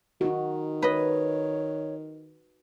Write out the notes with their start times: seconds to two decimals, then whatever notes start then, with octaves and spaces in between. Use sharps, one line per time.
0.21 D#3 D#4 F#4
0.82 B4 C#5 D#5